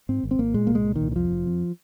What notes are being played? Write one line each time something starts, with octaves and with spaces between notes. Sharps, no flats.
G#2 C4
G#1
C4
G#1 A#3
A#2 G#3
C2 A#3
G#3
A#2
C2 D#3
D#3
F2 F3
F1
F2